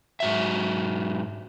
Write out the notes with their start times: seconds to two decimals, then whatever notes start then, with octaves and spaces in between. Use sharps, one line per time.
0.20 G#2 F#3 E5